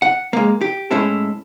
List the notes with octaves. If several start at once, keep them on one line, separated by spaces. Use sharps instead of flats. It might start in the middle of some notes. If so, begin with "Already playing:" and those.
F#5
G#3 A#3
G4
A2 G#3 C#4 E4 A4